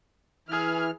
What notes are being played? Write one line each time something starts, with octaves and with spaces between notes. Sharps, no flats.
E3 E4 G#4 F6